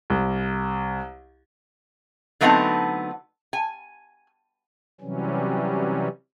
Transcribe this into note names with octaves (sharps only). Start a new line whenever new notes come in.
C2
D3 F#3 A3 B3 C4 D#4
G#5
C3 E3 F#3 G3 C#4